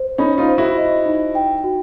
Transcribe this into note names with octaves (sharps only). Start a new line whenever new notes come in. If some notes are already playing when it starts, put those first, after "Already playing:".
Already playing: C5
C#4 D#4 B5
D#4 F4
C5
E4 F#4
D#5
D#4
G5
F#4